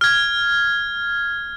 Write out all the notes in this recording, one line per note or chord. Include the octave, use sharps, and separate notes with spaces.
F6 G#6